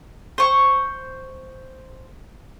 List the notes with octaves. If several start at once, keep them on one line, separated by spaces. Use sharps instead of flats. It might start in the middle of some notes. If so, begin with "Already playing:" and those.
C5 C#6